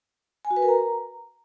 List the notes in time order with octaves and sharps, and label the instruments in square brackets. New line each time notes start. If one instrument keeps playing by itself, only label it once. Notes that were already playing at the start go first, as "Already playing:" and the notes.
[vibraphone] G#5
F#4
B4
A#4
A#5